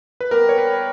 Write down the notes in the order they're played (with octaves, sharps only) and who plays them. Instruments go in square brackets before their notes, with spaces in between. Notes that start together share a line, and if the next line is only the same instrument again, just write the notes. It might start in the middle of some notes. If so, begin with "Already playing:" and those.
[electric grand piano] B4
[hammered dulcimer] G3 B3 G4 [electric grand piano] A#4
[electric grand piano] C#5
B4